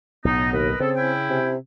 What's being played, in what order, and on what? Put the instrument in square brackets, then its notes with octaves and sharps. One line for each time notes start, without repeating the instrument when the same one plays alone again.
[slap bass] B1 A2 [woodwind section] B3 D#4
[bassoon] D#2 [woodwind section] A#4 B4 D#5
[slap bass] C#3 [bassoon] C4 [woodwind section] G#4 A4
[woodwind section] C#4 E4 G5
[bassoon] C3